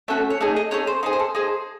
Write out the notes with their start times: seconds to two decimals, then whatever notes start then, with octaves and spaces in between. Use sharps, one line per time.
0.08 A3 C#4 F#4 A4 E5
0.30 C#5
0.41 A3 D#4 G#4 D#5
0.56 D#5
0.71 A3 D#4 G#4 C#5
0.87 C5
1.03 D#4 G#4 C5
1.13 C5
1.20 A4
1.35 D#4 G#4 C5